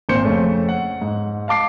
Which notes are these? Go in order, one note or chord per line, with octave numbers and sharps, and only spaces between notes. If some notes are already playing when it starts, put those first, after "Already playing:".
G#1 A#2 C4 C5 C#7
F2 C#3 A3 C#4
F#5
G#2
F5 A5 D6 C7